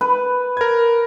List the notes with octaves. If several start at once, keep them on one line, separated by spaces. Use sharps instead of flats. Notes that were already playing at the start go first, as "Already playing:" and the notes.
B4
A#4 G#6